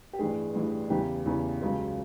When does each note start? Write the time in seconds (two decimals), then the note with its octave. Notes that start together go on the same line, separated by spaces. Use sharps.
0.13 G4
0.19 A1 G2 E3 G3 G#4
0.55 A1 G2 E3 G3
0.90 E2 C#3 E3 G4
1.26 E2 C#3 E3
1.62 C#2 C#3 F#3